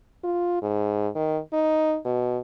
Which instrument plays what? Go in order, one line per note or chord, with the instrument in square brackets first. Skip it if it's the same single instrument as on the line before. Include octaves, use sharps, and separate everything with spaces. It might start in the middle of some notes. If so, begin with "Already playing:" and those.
[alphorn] F4
G#2
D#3
D#4
B2